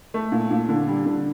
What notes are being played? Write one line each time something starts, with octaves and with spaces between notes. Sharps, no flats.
A3
A#2
A#2
D3
G3
D3